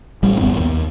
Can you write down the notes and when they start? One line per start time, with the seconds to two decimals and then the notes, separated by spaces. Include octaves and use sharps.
0.23 A1 G3
0.39 G1 E2 B3
0.56 D1 D#2